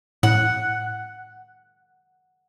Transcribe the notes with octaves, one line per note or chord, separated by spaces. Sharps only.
A2 F#5